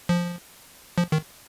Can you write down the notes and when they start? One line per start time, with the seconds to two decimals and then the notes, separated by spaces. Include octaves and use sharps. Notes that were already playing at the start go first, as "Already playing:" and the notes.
0.09 F3
0.98 F3
1.12 D#3